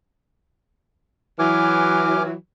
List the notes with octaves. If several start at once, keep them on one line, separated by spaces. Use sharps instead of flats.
E3 F#3 G#5 D6 F6